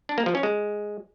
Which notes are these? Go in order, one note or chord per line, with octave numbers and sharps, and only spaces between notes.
D4
A#3
F3
C#4
G#3